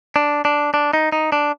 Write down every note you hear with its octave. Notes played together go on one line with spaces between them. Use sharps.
D4
D4
D4
D#4
D#4
D4